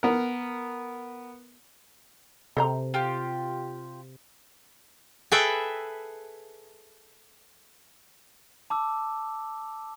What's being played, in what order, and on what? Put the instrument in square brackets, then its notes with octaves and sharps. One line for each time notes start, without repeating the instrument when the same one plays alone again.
[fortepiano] B3 A#4
[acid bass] C3 [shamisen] A4 C5 A#5
[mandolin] F4 G4
[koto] G#4 A4 B4 E5 G5
[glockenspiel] A5 D6 E6